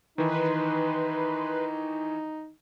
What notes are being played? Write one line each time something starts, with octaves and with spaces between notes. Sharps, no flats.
D#3 E3 D#4 B4 C6